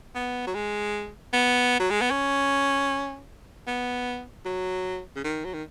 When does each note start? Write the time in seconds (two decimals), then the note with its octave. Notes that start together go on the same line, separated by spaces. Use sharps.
0.15 B3
0.47 F#3
0.54 G#3
1.33 B3
1.80 F#3
1.90 G#3
2.01 B3
2.11 C#4
3.67 B3
4.46 F#3
5.16 C#3
5.24 D#3
5.45 F#3
5.54 D#3